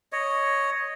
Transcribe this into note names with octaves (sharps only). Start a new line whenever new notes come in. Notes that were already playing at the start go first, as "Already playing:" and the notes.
C#5 D#5